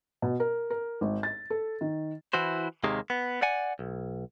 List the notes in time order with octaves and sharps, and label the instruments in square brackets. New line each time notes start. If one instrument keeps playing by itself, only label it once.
[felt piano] B2
A#4
A#4
G#1
A6
A4
D#3
[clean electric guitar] E3 E4 F#4 C5
D#2 C3 D#3 G#3 A#3
B3
D5 F#5 G#5
B1